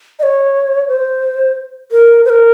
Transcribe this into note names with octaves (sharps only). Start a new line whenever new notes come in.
D#5
C#5
C5
A#4
C5
A#4